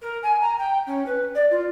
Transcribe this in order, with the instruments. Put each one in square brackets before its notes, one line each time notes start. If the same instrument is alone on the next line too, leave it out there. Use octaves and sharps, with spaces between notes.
[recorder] A#4
G#5
A#5
G5
C#4
B4
D5
F4